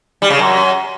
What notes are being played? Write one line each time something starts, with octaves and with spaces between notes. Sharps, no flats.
G3
C#3
F#2